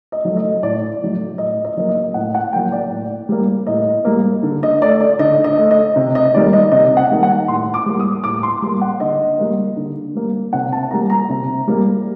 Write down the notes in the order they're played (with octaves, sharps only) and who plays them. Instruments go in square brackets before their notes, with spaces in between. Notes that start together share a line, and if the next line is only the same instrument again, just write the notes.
[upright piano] D#5
F#3 A3
D#5
A2 D5
F#3 A3
A2 D#5
D#5
F#3 A#3
D#5
A2 F#5
F#5
A#3 G5
F#3
D5
A2
G3 A#3
A2 D#5
G3 A#3
D3
D#5
A3 D5
D5
D3 D#5
D#5
A3
D#5
C3
D#5
D#3 G3 A#3 D5
D#5
C3 D#5
F#5
D#3 G3 A#3
F#5
A2 C6
D6
G3 A#3
D#6
A2 D6
C6
G3 C6
A#3
F#5
D3 D#5
G3 A#3
D3
G3 A#3
C3 F#5
A5
G3 A#3 A#5
A#5
C3
G3 A#3